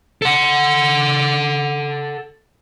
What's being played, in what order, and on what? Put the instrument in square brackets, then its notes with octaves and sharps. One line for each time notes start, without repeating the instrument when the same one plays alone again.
[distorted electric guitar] A4 F#5